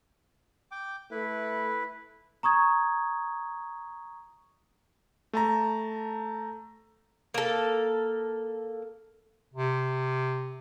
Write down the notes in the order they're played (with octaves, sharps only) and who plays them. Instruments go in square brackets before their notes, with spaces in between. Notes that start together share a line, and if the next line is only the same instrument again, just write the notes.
[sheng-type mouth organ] G5 D6
[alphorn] A3 [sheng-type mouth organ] E4 B4
[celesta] A#5 C#6 D#6 G#6
[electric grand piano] A3 A5 A#5
[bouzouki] A#3 A4
[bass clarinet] C3